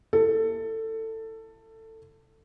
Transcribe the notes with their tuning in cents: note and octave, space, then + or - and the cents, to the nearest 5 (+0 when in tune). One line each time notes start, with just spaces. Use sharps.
E4 +20 A4 +20